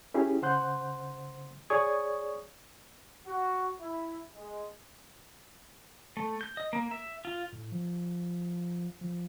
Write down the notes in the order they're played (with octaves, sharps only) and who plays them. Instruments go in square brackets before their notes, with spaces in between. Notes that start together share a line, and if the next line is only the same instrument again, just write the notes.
[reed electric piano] C#4 E4 G4 G#4
C#3 C5 F#5 C6 F#6 G6
G#4 C#5 D5 C#6 D#6 G#6
[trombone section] F#4
E4
G#3
[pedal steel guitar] A3
G6
D#5
A#3
E5
F4
[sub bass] A2
F3
F3